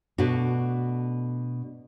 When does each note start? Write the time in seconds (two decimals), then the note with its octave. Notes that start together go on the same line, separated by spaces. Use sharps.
0.18 B2 A3 D4 F#4